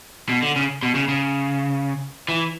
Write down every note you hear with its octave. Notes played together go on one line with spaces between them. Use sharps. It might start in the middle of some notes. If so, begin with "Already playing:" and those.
B2
D3
C#3
B2
C#3
C#3
E3